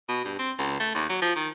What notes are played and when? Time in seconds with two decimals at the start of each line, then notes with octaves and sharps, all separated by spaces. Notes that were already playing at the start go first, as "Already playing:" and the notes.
0.09 B2
0.25 G2
0.39 C4
0.58 C#2
0.80 A3
0.95 D#2
1.09 F#3
1.22 F3
1.36 D#3